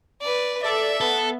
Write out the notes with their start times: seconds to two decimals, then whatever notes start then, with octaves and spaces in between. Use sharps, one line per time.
0.21 B4 D5
0.62 A4 D5 E5
1.01 B3 A4